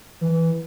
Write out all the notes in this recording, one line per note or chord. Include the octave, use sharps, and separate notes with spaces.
E3